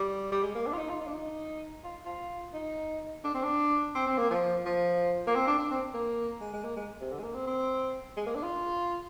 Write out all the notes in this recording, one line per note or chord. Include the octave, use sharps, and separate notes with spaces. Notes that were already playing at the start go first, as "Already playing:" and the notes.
Already playing: G3
G3
G#3
A#3
D4
F4
D#4
F4
D#4
D4
D#4
F4
F4
D#4
D4
C4
D4
C4
C4
A#3
F3
F3
A#3
C4
D4
D4
C4
A#3
G#3
G#3
A#3
G#3
C3
D3
G#3
A#3
C4
C4
G#3
A#3
D4
F4